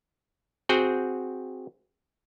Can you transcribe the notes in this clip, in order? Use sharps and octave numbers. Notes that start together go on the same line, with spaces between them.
C4 F#4 G#4 F#5 G5